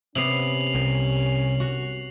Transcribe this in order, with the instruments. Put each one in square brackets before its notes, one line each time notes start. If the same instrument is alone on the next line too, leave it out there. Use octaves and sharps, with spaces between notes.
[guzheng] C3 B3 [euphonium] C#4 [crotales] C7 F7 F#7
[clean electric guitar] C2
[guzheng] F#4